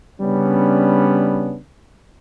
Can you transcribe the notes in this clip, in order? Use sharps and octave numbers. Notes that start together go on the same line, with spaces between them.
C#3 G3 B3 C#4 D4